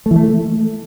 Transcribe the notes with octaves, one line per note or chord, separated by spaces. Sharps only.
A3
E3
A3